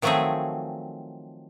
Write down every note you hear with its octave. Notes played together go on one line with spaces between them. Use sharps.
D#3 F3 F#3 A3 C4 G#4